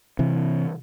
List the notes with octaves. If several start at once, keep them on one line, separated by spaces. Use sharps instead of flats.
C3 E3